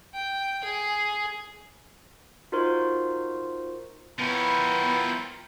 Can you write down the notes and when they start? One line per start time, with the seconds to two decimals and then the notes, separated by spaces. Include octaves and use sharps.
0.14 G5
0.64 G#4
2.52 D#4 F4 F#4 A#4 C5 C6
4.20 F3 B3 E4 A#4 C#5 G5 B5